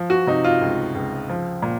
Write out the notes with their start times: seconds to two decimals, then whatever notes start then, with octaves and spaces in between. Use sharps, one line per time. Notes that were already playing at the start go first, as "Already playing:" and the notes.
Already playing: F3
0.10 F#4
0.27 C3 D#4
0.44 F4
0.61 C#2
0.95 C#2
1.29 F3
1.62 A#2